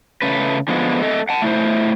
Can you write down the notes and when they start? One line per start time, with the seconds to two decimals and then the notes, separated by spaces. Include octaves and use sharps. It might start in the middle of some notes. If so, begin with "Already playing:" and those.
0.22 C#3 A3 B4
0.68 D3 F3 G#3 B3
1.02 A3 A4 D#5
1.29 F#5 A5
1.42 A3 E4 C5